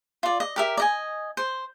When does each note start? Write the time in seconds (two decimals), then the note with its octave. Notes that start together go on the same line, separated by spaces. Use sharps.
0.23 F4 D5
0.40 D#5
0.56 G4 A#4 E5
0.77 D5 D#5 G#5
1.37 C5